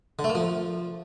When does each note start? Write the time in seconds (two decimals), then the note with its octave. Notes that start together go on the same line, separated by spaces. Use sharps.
0.19 D3
0.24 A3
0.30 A#3
0.35 F3